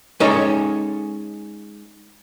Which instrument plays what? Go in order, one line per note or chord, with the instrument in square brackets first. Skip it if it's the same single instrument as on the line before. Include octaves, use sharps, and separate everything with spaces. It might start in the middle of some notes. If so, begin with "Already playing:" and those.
[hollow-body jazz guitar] G#3 C#4 D#4 A4 C#5 A#5